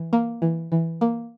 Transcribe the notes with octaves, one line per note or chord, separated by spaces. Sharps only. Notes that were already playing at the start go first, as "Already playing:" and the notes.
Already playing: E3
A#3
E3
E3
A#3